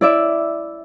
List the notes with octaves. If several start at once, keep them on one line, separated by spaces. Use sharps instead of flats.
E4 D5 E5